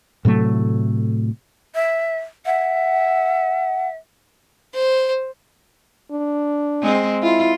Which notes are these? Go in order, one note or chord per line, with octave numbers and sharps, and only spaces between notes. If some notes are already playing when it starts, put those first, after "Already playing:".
A2 C3 F#3 A3
E5
E5 F#5
C5
D4
G#3 C4
E4 F4